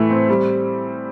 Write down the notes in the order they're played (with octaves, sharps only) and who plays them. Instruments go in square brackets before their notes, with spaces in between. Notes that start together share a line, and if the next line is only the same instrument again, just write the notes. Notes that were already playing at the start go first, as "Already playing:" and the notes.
Already playing: [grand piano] A2 E3 A3
C4
G3